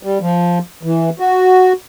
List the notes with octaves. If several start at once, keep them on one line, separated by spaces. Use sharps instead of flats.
G3
F3
E3
F#4